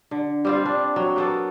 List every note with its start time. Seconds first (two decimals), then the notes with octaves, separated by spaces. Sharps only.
0.11 D3
0.45 G3 C4 F4
0.65 D4
0.96 F#3
1.16 A#3 B3 A4